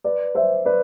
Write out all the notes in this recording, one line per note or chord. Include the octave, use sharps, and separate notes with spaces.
B4 D5
C5 E5
B4 D5